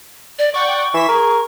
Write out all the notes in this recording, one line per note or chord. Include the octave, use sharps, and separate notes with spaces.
D5
D5 F#5 G5 C#6
E3 B6 E7
G#4 A#4